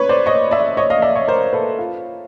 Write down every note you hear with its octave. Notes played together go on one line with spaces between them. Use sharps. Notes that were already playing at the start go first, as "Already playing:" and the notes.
Already playing: B4 C#5
C5 D5
C#5 D#5
D5 E5
C#5 D#5
D#5 F5
D5 E5
C#5 D#5
A#4 C5
A4 B4
F4